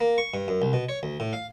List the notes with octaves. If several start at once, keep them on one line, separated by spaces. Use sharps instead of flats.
A#3
C#6
G2
F#2
C2
B2
C#5
D2
A2
F5